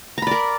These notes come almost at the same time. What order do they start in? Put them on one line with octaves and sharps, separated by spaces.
A#5 B5 D5 A#4